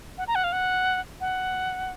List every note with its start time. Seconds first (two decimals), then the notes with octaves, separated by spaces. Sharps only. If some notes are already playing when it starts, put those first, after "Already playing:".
0.18 F#5
0.27 A#5
0.35 F#5
0.44 F5
0.52 F#5
1.21 F#5